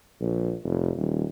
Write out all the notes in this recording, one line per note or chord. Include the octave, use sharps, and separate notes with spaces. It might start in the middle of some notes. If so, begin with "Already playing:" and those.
A#1
F1
D#1